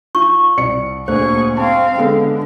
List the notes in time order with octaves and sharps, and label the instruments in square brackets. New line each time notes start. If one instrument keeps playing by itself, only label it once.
[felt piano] F4 [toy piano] C#6
[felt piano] C2 D5 C#7
[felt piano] D2 A#2 [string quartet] G#4 C#6 [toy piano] C5
[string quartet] C4 F5 [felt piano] A5
[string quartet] D3 [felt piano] G#3 B3 A4